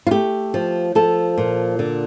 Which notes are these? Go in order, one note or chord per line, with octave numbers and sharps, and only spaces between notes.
F4
A3 G4
F3
F3 A4
A#2
D3